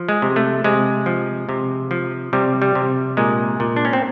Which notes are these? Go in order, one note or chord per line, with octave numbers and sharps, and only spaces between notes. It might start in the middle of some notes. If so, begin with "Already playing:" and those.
Already playing: F3
G#3
C3
A3
C3 G#3
F3
C3
F3
C3 G3
G3
C3
A#2 G#3
A#2
D4
C#4
C4